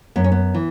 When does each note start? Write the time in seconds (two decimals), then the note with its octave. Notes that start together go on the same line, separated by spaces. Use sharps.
0.16 F#2 B3
0.24 C#4
0.32 B3
0.55 E3